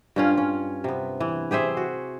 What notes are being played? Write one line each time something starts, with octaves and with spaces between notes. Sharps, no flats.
G2 C#4 F4
C#4
C3 B3
E3
G4 G#4 C5 E5
F#4